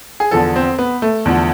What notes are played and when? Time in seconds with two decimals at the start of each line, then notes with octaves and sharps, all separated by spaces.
0.20 G#4
0.31 E2 D3 F3 A4
0.56 C4
0.79 B3
1.02 A3
1.25 E2 D3 F3